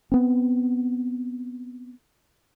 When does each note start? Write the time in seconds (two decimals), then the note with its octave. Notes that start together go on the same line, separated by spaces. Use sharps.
0.12 B3 C4